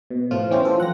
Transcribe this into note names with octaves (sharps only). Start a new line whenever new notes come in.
B2
A2 F3 F4
E3 C#4 G4 C5
F4 A4
F3 F#5 A#6